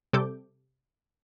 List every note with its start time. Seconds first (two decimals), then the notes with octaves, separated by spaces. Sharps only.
0.13 C3 G3 A4 D6 G6